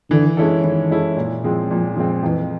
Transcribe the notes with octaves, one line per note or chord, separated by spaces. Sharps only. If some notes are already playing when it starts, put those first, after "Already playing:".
D3 E3
G#3 C#4 E4 A4
D#3 E3
G#3 C#4 E4 A4
A#2
F3 G#3 C4
A#2 F3
F3 G#3 C4
F2 E3